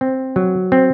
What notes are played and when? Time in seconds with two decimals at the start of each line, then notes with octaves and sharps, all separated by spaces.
0.01 C4
0.36 F#3
0.72 C4